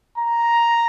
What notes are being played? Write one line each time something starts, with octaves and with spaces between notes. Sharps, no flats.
A#5